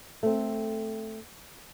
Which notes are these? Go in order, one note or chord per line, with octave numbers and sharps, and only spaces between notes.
A3 C4